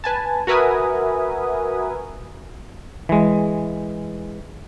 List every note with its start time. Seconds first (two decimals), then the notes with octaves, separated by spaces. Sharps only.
0.04 B4 G#5 A5
0.47 F#4 A#4 B4 E5 G#5 D#6
3.09 E3 G#3